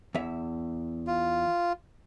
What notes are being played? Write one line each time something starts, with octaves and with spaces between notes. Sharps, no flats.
E2 E5
F4